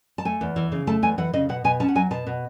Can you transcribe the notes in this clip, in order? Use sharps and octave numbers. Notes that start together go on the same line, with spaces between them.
A5
A3 G#5
E2
E3
C#3
A3 A5
E2 G#5
E3 F#5
C#3 D#5
B2 F#5
B2 G#5
C#4 A5
F#5
F#3 G#5
B2 A5
B2